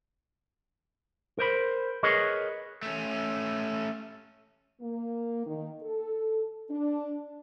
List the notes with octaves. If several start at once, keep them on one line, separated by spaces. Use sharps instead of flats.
A#4 C5 B5
G#4 A#4 B4 C#5 D#5
A3 C#4
A#3
D#3
A4
D4